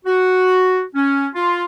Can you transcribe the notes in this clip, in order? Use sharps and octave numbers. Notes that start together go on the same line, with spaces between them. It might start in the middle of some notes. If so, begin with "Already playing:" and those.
F#4
C#4
F4